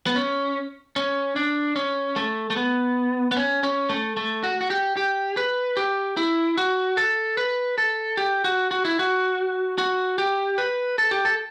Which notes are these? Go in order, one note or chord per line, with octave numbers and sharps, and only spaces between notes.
B3
C#4
C#4
D4
C#4
A3
A3
B3
B3
C#4
C#4
A3
A3
F#4
F#4
G4
G4
B4
G4
E4
F#4
A4
B4
A4
G4
F#4
F#4
E4
F#4
F#4
G4
B4
A4
G4
A4